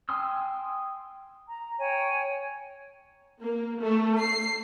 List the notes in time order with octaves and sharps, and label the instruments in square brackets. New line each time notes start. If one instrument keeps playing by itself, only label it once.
[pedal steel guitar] G5 G#5 C6 D#6 E6
[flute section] A#5
C#5 G5 G#5
[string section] A#3
A3
C7